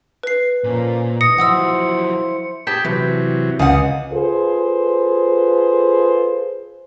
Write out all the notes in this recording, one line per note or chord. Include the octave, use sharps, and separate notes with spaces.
B4 C7
A#2 F3 A#3 C#4
D2 E3 D#5 D#6 A#6 C#7
F3 F#3 E4 C5 F#5 D#6 E6
G4 G#4 G5 A5 B6
C3 E3 F#3
C#2 F5 F#5 D#6
F4 G#4 A4 B4 C5